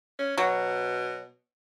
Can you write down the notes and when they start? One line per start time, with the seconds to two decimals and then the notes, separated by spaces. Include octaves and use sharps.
0.19 C#4
0.38 B2 F#3